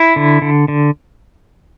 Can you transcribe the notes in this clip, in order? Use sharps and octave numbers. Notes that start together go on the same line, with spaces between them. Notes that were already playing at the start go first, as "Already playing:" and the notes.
Already playing: E4
D3
D3
D3